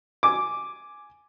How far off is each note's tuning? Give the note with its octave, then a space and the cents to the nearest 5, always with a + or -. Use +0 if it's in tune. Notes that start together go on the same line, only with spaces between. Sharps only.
G#5 +5 D6 +0